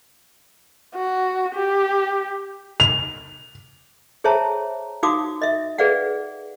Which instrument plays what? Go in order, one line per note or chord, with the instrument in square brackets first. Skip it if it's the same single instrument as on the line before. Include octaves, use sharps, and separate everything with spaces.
[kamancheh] F#4
G4
[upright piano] F7
[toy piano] G#4 C5 C#5 E5 A5 A#5
D#4 F#4 F5 D6 D#6
D#5 E5
G#4 B4 D5 F5 F#5